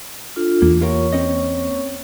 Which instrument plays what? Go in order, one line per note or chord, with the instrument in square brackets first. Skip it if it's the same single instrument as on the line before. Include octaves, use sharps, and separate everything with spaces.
[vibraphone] D4 F4 A4
[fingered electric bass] E2 [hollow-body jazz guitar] A#3
[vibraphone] A#3 C#5 C#6 [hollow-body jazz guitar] F4 G4 A#4
[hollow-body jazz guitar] C4 C#4 D#5